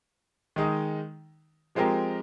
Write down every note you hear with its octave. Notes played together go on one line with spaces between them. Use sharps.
D#3 G#3 D#4
F3 G#3 C4 G4 A#4